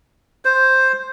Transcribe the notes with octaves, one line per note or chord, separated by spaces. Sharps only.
C5